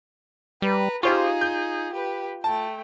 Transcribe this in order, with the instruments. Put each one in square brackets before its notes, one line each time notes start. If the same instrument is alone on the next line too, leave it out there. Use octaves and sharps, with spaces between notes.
[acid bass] G3 [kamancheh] B4 A#5
[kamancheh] D#4 G#4 [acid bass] F4 [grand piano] G4 C5 C#6
[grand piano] G6
[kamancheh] G4 B4
[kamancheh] A3 G5 [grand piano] A5